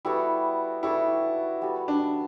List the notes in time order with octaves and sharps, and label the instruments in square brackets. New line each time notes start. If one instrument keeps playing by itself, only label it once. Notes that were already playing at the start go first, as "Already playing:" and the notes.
[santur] G3 B3 F#4 A4 [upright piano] E4
[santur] G3 B3 F#4 A4 [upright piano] E4
[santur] G3 B3 F#4 A4
[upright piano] D4